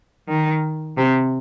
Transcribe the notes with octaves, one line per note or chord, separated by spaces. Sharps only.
D#3
C3